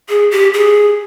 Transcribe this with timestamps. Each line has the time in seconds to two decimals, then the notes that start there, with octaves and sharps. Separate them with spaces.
0.09 G#4
0.31 G4
0.54 G#4